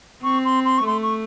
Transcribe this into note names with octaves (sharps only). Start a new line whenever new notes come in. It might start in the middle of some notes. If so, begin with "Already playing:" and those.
C4 C#6
C6
C6
C#6
A3 C6
C#6